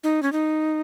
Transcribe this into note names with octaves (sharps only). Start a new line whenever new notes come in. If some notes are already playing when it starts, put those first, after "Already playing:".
D#4
C#4
D#4